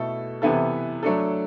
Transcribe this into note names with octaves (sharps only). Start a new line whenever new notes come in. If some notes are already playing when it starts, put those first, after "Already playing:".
Already playing: B2 A3 E4 A4
C3 E3 B3 E4 A4
F#3 A3 D4 A4